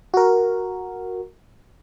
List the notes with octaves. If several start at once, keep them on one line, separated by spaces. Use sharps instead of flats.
F#4 A#4